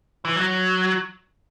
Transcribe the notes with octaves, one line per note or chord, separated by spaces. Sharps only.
E3
F#3